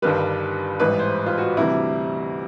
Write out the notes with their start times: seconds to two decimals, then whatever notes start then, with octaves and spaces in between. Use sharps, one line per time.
0.02 G1 G2 D#3 G3 B4
0.80 A1 G#2 E3 G3 B4
0.99 C5
1.26 F4
1.38 F#4
1.57 D2 C3 E3 G3 E4